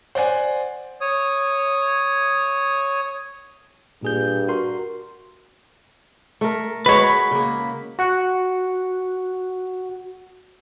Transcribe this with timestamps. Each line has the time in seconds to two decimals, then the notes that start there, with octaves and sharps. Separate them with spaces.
0.15 C5 D5 F#5 G#5
1.01 C#5 D#6
4.03 G2 A#2 G#4 G6
4.48 F#4 A#4 C6
6.41 A3 A#4
6.86 G#3 F#4 B4 C#5 D#5
7.03 B5
7.31 C#3 A#3
7.99 F#4 F#5